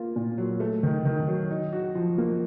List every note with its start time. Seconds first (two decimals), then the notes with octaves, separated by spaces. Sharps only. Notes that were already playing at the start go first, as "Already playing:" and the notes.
Already playing: A#3 F4
0.16 A#2
0.38 F#3
0.60 A3
0.83 D#3
1.05 D#3
1.28 F#3
1.51 D#4
1.73 F#4
1.95 F3
2.18 A#3